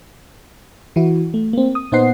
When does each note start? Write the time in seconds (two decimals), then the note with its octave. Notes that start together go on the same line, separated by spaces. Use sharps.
0.96 E3 E4 F#4
1.34 A3
1.53 A#3 C4
1.75 D#6
1.92 A#2 B3 D#4 C5 F#5 C7